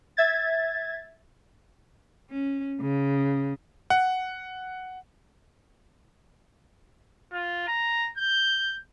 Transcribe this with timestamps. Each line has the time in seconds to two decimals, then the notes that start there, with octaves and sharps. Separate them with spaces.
0.17 E5 G#6 A6
2.30 C#4
2.81 C#3
3.90 F#5
7.32 F4
7.68 A#5
8.18 G6